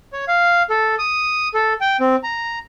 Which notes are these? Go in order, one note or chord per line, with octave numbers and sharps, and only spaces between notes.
C#5
F5
A4
D#6
A4
G5
C4
A#5